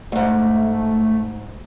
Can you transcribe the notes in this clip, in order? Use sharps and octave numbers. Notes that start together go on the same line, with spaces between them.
F2 G#2 A3